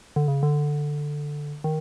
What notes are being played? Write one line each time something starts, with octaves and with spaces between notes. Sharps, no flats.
D3
C#3
D3
D#3